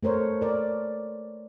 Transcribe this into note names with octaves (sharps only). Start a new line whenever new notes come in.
A3 A#4 C5 C#5
A#4 D5